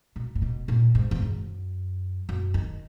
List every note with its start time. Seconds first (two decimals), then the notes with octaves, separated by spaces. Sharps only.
0.16 B2
0.35 A#2
0.42 B2
0.68 A#2
0.95 G#2
1.11 E2
1.22 F#2
2.29 F#2
2.54 D#3